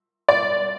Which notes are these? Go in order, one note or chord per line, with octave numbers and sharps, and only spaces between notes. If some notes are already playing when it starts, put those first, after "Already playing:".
D5